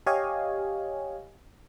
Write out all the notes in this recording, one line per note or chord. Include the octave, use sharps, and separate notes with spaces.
G4 C#5 D#5 F5 G#5